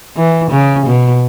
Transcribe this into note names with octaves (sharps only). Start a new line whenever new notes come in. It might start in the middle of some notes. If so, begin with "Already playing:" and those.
E3
C#3
B2